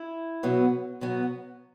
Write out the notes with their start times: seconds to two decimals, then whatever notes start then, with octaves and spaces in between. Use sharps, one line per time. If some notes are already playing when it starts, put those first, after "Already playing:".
Already playing: E4
0.43 B2 F#3 B3
1.01 B2 F#3 B3